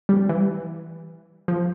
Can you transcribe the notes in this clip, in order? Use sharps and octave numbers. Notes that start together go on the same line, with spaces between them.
G3
E3
F3